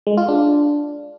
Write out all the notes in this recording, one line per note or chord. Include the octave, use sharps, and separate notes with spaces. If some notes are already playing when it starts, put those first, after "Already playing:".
G#3
F4
D4